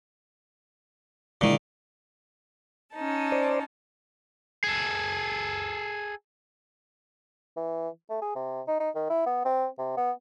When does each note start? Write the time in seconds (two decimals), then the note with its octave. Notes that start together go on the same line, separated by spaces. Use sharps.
1.41 A#2 D3 D#3 G#3 E4
2.93 C#4 D#4 A5
3.32 C5 D5
4.64 G#4 A4
7.57 E3
8.10 A3
8.22 G#4
8.35 C3
8.67 D#4
8.80 D#4
8.95 D#3
9.10 E4
9.26 B3
9.45 C4
9.78 C3
9.97 B3